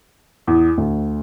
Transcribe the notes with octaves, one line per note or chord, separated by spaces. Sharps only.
E2
D2